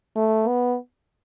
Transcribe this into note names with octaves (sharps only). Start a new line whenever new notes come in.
A3
B3